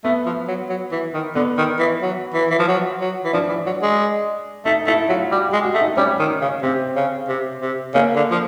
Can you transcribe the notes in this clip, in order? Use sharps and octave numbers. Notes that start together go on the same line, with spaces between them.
A3 B3
F3
F#3
F#3
E3
D#3
D3 B3
D#3
E3
F#3
E3
E3
F3
F#3
F#3
E3
F3 D4
E3
F#3
G#3
A3 D#4
A3 E4
F#3 F4
G3 F#4
G#3 G4
F#4
A3
D#4
G3 C#4
D#3
C#3
C3 C4
C#3
C3
C3
C#3 A#3
D3
F3